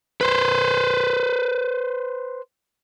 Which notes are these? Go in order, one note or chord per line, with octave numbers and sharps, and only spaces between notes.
B4 C5